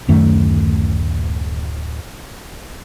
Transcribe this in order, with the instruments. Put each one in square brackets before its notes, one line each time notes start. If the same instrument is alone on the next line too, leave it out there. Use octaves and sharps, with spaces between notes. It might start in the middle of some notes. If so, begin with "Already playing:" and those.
[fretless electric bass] D1 F#2 D#3 A3